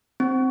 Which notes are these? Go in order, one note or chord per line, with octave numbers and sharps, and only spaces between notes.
C4